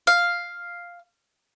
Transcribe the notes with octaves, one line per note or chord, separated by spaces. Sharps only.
F5